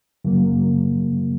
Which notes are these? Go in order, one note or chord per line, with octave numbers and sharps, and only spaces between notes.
F#2 C#3 F#3 A#3